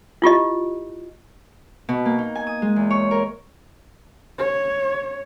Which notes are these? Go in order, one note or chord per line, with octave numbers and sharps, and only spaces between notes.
E4 F4 G4 D#5
B2
A#3
D#4
G#5
D#6
G#3
E2
C#5
A#4
C#5